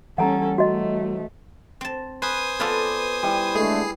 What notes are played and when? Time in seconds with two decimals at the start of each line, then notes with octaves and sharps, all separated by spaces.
0.18 E3 G3 C#4 A4 F#5 G#5 A#5
0.58 A3 F#4 D#5
1.81 C4 A5
2.22 B4 C5 G#5 D#6
2.60 B3 F4 A4 B4 D5
3.23 G3 E4
3.55 D3 G#3 A3 G#4 C7